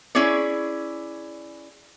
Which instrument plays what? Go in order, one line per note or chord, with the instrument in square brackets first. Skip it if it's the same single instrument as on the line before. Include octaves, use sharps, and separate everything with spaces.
[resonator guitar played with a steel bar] C#4 E4 G#4 C#5 D5